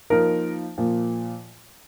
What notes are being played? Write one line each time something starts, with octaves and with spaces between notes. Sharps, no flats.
F3 A#3 D#4 A#4
A#2 F3 A#3